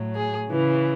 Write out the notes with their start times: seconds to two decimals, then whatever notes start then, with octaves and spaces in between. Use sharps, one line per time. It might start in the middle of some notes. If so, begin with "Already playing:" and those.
Already playing: A2 F#3
0.15 G#4
0.50 C#3 E3